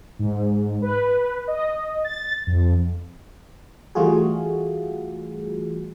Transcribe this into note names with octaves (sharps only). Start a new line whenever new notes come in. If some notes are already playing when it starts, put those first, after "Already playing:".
G#2
B4
D#5
A6
F2
E3 G3 A3 F4 F#4 G#4